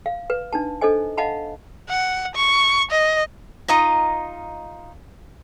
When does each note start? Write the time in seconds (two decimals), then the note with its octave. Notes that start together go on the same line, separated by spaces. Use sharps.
0.06 F5
0.30 B4
0.53 D4 D#4 A5
0.81 D4 A4 C5 D#5 G#5
1.18 D#5 F5 F#5 A5 B5
1.89 F#5
2.36 C#6
2.91 D#5
3.68 D#4 F4 D#5 A#5